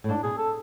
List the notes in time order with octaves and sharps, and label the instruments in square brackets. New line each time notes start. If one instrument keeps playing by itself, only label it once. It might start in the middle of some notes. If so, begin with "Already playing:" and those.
[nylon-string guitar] A2
[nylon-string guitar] G#2 [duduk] D4
[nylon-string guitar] B2 [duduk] G#4
[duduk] A4